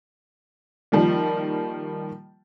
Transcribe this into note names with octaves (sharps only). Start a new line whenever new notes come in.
D#3 F3 G3 A#3